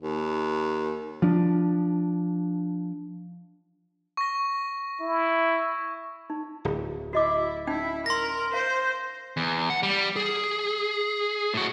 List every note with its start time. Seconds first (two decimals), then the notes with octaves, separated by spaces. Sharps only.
0.02 D#2
1.22 F3 D4
4.17 C#6 A#6
5.01 E4
6.30 D#4
6.65 D1
7.13 E4 F#4 D#5 D6
7.67 C#4 D#4 E4 G5
8.06 A#4 C6 A#6
8.54 C5 F5
9.37 E2
9.70 F#5
9.83 G3
10.16 G#4
11.54 A2 F#4